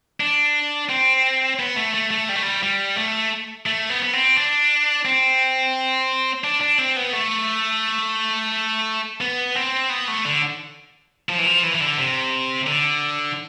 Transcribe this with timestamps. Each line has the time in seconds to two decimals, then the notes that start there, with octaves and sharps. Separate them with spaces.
0.20 D4
0.90 C4
1.59 B3
1.76 A3
1.94 A3
2.11 A3
2.29 G3
2.36 A3
2.43 G3
2.63 G3
2.97 A3
3.66 A3
3.90 B3
4.03 B3
4.13 C4
4.37 D4
5.05 C4
6.44 D4
6.61 D4
6.78 C4
6.96 B3
7.13 A3
9.21 B3
9.55 C4
9.90 B3
10.08 A3
10.25 D3
11.29 F3
11.38 E3
11.46 F3
11.63 E3
11.75 E3
11.80 D3
11.98 C3
12.67 D3